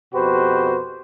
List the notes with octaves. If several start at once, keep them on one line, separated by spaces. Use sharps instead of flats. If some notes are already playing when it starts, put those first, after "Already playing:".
F2 B2 F#4 G4 B4 C5